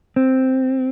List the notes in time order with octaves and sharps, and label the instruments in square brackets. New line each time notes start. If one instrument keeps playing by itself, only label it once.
[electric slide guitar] C4